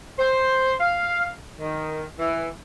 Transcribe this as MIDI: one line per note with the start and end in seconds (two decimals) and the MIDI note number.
0.18 0.71 72
0.80 1.28 77
1.59 2.05 51
2.19 2.47 52